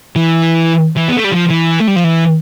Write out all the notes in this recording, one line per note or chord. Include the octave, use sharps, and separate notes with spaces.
E3
E3
B3
A3
G3
F3
E3
A3
G3
F3
E3